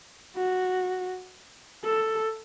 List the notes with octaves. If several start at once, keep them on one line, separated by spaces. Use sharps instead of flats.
F#4
A4